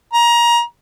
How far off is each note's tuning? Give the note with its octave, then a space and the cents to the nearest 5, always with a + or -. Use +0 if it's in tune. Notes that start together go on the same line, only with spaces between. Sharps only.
A#5 +25